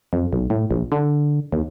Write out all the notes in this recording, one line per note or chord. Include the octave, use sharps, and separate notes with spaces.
F2
B1
A2
A#1
D3
D#2